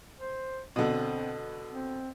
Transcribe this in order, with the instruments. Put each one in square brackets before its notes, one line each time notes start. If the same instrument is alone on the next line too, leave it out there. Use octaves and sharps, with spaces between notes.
[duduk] C5
[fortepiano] B2 D3 [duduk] C4
[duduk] C4